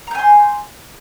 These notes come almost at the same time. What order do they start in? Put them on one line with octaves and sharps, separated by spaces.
A#5 G6 G#5 C6